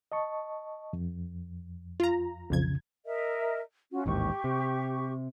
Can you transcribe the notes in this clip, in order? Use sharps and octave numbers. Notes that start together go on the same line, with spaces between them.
D#5 A5 C#6
F2
F4 A#5
B1 F2 C#3 G#6
A#4 D#5 E5
C#4 F4 F#4
A1 D#2 G#2 G4 C#6
C3